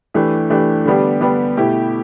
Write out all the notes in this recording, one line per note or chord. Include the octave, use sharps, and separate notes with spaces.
E3 A3 D4 G4
E3 A3 D4 G4
D3 G3 B3 D4 G4
D3 G3 B3 D4 G4
B2 A3 E4 G4